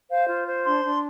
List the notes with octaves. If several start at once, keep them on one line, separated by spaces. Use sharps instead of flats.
C5 F5
F4
C5
D4 C6
D4